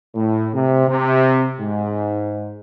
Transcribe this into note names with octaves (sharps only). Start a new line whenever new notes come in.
A2
C3
C3
G#2